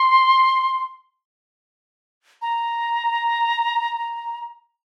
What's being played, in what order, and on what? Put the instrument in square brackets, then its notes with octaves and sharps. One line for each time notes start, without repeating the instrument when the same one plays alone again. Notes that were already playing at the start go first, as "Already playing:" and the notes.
Already playing: [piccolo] C6
A#5